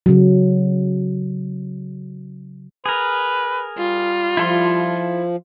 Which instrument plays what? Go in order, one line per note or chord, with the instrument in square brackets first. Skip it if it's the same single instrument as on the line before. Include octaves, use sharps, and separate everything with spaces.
[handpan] C#3 F#3
[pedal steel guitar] G#4 A#4 [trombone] B4
[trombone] G3 [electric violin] F4
[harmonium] F3 [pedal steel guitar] E4 A4 C6